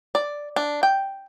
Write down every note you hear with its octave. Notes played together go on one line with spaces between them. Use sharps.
D5
D4
G5